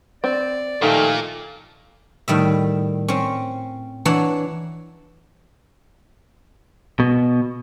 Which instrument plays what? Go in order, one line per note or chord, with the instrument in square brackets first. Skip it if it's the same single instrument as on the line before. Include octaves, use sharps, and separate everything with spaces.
[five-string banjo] C4 [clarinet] D5
[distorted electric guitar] A#2 [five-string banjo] D#3 F3 G4 [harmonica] A3 [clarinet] F5
[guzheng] A2 D#3 G3 E5
C4 C#4
E3 D4 C#5 F#5 A5 A#5
[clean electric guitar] B2